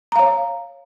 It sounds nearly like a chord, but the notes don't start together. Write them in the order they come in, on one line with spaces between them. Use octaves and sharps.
A#5 F5 C#5